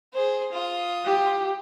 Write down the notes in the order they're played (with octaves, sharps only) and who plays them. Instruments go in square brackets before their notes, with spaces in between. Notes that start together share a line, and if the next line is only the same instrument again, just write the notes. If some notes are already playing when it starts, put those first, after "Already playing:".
[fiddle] G#4 C5
F4 D#6
[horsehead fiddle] G4